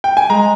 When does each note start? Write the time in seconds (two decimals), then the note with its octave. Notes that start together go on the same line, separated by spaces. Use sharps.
0.04 G5
0.17 G#5
0.30 G#3 A#5